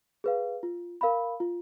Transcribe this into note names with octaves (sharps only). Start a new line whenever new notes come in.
G#4 B4 F5
F4
A#4 F5 B5
F4